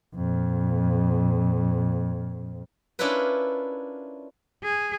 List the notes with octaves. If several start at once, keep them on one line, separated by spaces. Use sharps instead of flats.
F2 A#2
C#4 D4 E4 F4 A#4 B4
G#4